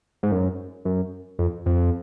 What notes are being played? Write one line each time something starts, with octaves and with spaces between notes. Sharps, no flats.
G#2
F#2
F#2
F2
F2